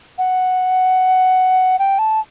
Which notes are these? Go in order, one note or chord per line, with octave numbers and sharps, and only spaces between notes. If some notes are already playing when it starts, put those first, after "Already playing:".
F#5
G5
A5